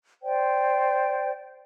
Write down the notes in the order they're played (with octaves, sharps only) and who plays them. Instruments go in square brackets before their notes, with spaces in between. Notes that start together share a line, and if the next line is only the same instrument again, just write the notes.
[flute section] C5 D5 G5